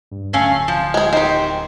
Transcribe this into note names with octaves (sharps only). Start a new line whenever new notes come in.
G2
D1 A3 C#4 F5
F3
G#3 G#4
D#3 G4 C5